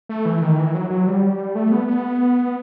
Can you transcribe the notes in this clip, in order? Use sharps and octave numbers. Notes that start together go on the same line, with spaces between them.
A3
E3
D#3
E3
F#3
F#3
G3
A3
B3
B3